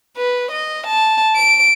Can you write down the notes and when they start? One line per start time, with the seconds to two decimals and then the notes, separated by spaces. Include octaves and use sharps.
0.17 B4
0.51 D#5
0.87 A5
1.36 D7